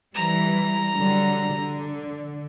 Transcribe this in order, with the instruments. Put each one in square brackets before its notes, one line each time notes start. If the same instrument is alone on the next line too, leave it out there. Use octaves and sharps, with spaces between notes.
[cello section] E3 G3 [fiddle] A#5
[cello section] D3 F#3 G3
D3